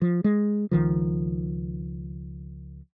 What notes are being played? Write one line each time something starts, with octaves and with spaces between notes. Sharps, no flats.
F3
G#3
C#2 D#3 F3